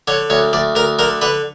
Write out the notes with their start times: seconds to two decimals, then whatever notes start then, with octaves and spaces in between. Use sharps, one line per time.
0.08 D3 C#5
0.30 D2 C#5
0.53 D2 D5
0.75 D2 A#4
0.99 D3 A#4
1.21 D3 B4